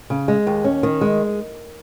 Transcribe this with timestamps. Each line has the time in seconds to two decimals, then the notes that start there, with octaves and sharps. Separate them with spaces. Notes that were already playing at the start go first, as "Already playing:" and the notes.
0.10 C#3
0.28 G#3
0.47 D#2
0.64 C#4
0.83 D#3
1.01 G#3